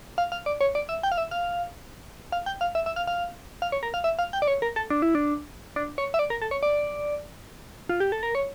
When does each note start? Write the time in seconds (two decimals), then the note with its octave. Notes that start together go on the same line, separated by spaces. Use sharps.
0.18 F5
0.32 F5
0.46 D5
0.61 C#5
0.75 D5
0.89 E5
1.03 G5
1.12 F5
1.18 E5
1.31 F5
2.32 F5
2.46 G5
2.61 F5
2.75 E5
2.86 E5
2.96 F5
3.07 F5
3.62 F5
3.72 C#5
3.83 A#4
3.94 F5
4.04 E5
4.19 F5
4.33 G5
4.42 D5
4.48 C#5
4.62 A#4
4.76 A4
4.90 D4
5.02 E4
5.15 D4
5.76 D4
5.98 C#5
6.14 E5
6.19 D5
6.30 A#4
6.42 A4
6.51 C#5
6.63 D5
7.89 F4
8.00 G4
8.12 A4
8.23 A#4
8.35 C#5